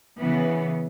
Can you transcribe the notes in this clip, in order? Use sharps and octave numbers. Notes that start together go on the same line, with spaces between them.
C#3 E3 B3